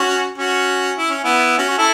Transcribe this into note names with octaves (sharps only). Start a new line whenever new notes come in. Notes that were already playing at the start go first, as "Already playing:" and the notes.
Already playing: C#4 F#4
C#4 F#4
E4
C#4
B3 E4
C#4 F#4
F#4
E4 A4